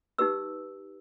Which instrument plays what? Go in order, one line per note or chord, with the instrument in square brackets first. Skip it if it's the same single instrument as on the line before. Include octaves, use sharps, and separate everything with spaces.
[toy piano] D#4 G4 B4 E6